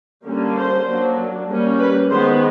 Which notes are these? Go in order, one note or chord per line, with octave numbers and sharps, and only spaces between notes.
D3 G3 A#3 C#4
C5
F#3 A#3 D4
G3 A#3 C#4
B4
D#3 G#3 B3 C5